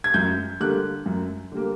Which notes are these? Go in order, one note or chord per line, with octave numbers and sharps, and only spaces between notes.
G#6
F#2 G6
D3 G3 A#3 F#6
F#2
D3 G3 A#3